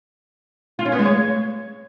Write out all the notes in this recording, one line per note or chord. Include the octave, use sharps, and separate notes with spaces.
F4
C#4
B3
G#3
C#5